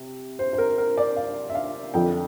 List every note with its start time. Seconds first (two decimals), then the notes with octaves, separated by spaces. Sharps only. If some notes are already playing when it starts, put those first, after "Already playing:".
Already playing: C3
0.39 C5
0.53 C5
0.58 A#4
0.78 A#4
0.98 D5
1.16 F5
1.50 E5
1.55 F5
1.94 F2 D3 F3 G5